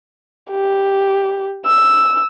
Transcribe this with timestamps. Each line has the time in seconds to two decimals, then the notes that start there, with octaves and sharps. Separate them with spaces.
0.51 G4
1.66 E6